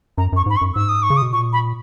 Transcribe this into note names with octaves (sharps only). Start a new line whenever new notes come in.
F#2 A#5
F#2 C#6
G#2 B5
C#6
F#2
G#2 E6
D#6
C#6
C#3
D#6
B2
A#2 C#6
B5